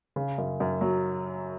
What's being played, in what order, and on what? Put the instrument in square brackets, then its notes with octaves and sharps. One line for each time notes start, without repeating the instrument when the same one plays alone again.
[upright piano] C#3
F#2
F#2
F#3